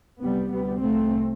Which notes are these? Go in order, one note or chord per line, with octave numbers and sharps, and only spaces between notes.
C2 C3 G3 B3
D2 C3 G3 B3
C2 C3 A3 C4